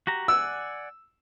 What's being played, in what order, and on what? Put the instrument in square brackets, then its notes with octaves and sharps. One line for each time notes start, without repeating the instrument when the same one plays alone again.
[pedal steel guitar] F#4 G4 A#5
[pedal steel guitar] D5 F#5 G#5 [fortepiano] E6